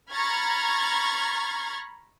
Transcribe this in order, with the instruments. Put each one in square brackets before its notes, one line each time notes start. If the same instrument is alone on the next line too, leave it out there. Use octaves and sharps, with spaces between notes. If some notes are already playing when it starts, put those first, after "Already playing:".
[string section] A#5 B5 C#6 F6 G#6 A6